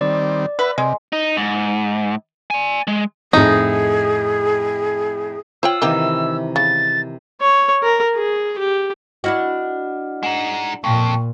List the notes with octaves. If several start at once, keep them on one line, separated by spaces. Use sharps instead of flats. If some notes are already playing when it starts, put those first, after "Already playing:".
D#3 G3 C4 D5
B4 E5 F#5 B5
C3 G#3
D#4
G#2
D5 G#5
G#3
F2 A2 D#4 G#4
F4 C5 C#5 F#5 G5 E6
C3 D#3 E3 A#3 D#4 G4
C#3 A6
C#5
A#4
G#4
G4
D4 E4 F#4 D#5 F#5 F6
G#3 D#4 F#5 E7 F#7
F2 A#2 G5 C#6